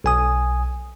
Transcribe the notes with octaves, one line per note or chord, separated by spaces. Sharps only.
B1 G#5 D#6